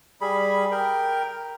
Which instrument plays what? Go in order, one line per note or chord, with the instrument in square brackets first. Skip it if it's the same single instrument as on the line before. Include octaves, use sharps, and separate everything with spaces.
[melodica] G3 G#4 B5
A#4 G5